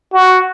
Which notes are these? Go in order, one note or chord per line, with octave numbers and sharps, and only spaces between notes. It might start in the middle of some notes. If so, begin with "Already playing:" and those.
F#4